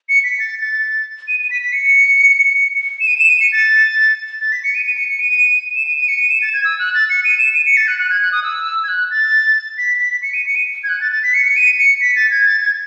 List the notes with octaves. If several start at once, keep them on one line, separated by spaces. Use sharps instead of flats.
C#7
B6
A6
A6
D#7
D#7
B6
B6
C#7
E7
D#7
E7
D#7
C#7
A6
A6
B6
C#7
D#7
D#7
C#7
C#7
D#7
E7
D#7
D#7
C#7
D#7
E7
A6
G#6
E6
F#6
A6
C#7
D#7
E7
D#7
C#7
A6
F#6
F#6
G#6
F#6
D#6
E6
G#6
F#6
A6
B6
B6
C#7
D#7
C#7
D#7
G#6
F#6
A6
A6
B6
C#7
C#7
D#7
C#7
B6
A6
G#6
A6
G#6